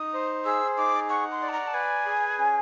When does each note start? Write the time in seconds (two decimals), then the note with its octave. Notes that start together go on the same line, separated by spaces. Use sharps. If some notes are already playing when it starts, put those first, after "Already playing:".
Already playing: D#4 D#6
0.14 C5
0.45 G#4 E6
0.77 D#4 D6
1.09 F#5 C#6
1.31 C6
1.42 D5
1.49 A5
1.52 A#5
1.68 A5
1.74 B4 G#5
2.06 G#4
2.39 C#4